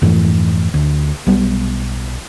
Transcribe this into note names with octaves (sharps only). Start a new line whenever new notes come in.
F2 G#2 E3 A3
D2
B1 G3 B3